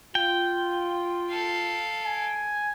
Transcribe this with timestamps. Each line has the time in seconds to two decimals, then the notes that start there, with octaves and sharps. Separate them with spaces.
0.15 F4 G5
1.30 A4 F5
2.05 G#5